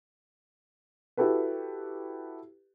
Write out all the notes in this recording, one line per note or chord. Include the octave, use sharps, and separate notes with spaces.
E4 F#4 G4 A4 B4